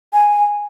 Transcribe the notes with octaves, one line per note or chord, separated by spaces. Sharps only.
G#5